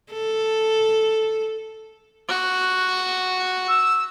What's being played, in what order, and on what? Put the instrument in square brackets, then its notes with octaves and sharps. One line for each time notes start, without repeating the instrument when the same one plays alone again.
[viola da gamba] A4
[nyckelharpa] F#4
[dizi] E6